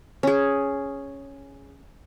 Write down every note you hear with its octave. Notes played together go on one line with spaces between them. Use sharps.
C#4 G#4